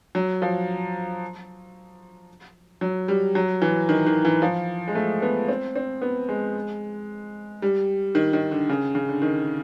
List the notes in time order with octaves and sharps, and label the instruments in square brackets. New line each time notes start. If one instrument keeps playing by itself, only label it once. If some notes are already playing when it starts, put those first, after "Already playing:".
[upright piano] F#3
F3
F#3
G3
F#3
E3
D#3
D#3
E3
F3
G#3
A3
B3
C4
C4
B3
G#3
G3
D#3
D#3
D3
C#3
C#3
D3
D#3